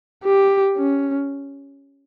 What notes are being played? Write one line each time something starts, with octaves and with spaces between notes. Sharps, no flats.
G4
C#4